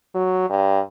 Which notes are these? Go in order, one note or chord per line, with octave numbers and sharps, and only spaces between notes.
F#3
G2